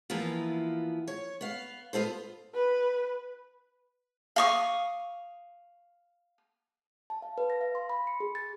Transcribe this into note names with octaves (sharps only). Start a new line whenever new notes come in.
E3 F3 A#3 B3 E4 F4
C#5
B3 F5
B3 F4 A4 C5
B4
F5 C#6 D#6
A5
F5
B4
A#6
F5
C6
B5
C#7
G#4
A6